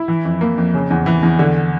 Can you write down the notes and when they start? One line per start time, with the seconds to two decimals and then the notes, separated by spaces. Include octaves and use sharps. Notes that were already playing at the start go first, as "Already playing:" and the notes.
Already playing: E4
0.08 E3
0.25 F2
0.41 A#3
0.58 F2
0.74 C#3
0.90 E2
1.06 E3
1.23 E2
1.39 D3